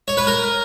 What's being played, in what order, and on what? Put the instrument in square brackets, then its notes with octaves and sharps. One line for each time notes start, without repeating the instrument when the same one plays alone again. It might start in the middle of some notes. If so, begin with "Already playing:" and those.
[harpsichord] C#5
B4
A#4